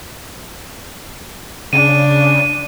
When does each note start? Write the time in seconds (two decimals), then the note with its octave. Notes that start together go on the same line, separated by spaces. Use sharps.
1.73 C#3 D4 D#7